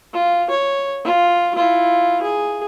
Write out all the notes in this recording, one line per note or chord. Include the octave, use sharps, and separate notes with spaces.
F4
C#5
F4
E4 F4
G#4